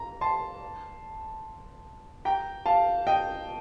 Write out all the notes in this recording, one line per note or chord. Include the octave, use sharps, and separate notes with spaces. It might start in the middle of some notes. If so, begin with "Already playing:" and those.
Already playing: A#5
A5 C6
G5 A#5
F5 A5
D#5 G5